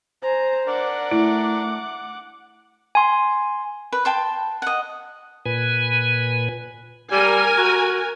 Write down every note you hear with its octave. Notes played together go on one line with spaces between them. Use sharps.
C5 G#5 A#5
D4 A#4 D5 F#5 D6
A3 E4
G#5 C6
B4
G5 A5 C6
D#5 F#5
A#2 B4 G#5
G3 A#4 G#5
F#4